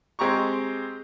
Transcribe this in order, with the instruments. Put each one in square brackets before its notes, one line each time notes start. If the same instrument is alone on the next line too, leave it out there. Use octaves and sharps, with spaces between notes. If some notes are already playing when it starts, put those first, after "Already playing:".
[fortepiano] G#3 C4 G4 A#5 C#6